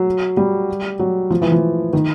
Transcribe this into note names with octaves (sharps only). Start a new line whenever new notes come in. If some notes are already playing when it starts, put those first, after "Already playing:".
Already playing: F#3
G3
F#3
F3
E3
F3
D#3